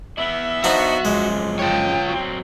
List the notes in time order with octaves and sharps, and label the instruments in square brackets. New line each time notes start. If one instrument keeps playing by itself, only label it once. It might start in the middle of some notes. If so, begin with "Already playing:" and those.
[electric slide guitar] B3 E4 [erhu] E5
[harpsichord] F3 D4 D#4 [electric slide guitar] B3 [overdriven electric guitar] F#4
[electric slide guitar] F#2 C#3 F3 [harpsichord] G#3
[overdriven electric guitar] F4 C#5 [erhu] G5
[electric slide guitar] F#3 C4